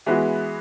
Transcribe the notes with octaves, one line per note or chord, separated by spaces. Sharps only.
E3 G#3 B3 F#4